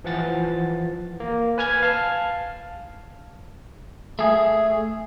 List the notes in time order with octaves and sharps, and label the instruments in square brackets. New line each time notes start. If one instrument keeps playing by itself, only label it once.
[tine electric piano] E3 F3 F#5 A6
A#3
B4 G#5 F6 G#6
F5 A5 F6
[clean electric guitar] A3 G#4